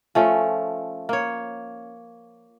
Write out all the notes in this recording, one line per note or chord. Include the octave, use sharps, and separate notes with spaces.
F3 A3 C#4
A#3 C#5